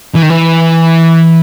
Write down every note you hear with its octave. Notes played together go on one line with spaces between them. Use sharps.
E3
D#3
E3